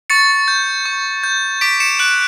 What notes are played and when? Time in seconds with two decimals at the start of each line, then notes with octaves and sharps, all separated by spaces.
0.10 C#6 A6 C#7
0.48 G6
0.86 C#6
1.23 G6
1.61 D6 B6 D7
1.80 C#7 E7
1.99 F#6 D7 F#7